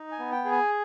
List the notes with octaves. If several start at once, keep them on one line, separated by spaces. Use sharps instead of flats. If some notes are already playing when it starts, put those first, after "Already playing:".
Already playing: D#4
G#5
B3
G5
G#4
G#5